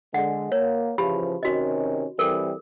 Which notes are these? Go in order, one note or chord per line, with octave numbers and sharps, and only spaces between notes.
D3 G#3 F#5
A#3 C#5
C#3 E3 F3 G4 B5
C3 D#3 C#4 F#4 D#5
E3 G3 C4 A4 A#4